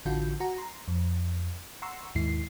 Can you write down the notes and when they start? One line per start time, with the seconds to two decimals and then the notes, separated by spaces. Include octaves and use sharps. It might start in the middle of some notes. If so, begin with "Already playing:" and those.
0.05 A1 D3 E3 F4 F#4 G6
0.40 F#4 A#5
0.58 A#5 C6
0.88 F2
1.82 F#5 A#5 C6 C#6 E6
2.15 D#2 G#2 E4 C7